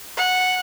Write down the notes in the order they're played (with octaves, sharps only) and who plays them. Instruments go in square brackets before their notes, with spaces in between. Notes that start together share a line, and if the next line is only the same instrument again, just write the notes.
[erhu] F#5